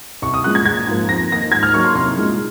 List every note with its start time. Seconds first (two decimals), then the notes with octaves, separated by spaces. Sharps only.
0.22 C2 C#6
0.34 D#6
0.44 A#2 G#3 F#6
0.55 G#6
0.65 A#1 G#6
0.87 G#2 F3 A#3
1.09 F2 A#6
1.31 D#3 A#3 D#4 A#6
1.52 G#2 G#6
1.63 F6
1.74 F#3 A#3 D#4 C#6
1.84 C6
1.95 C2 C6
2.17 A#2 G#3 D#4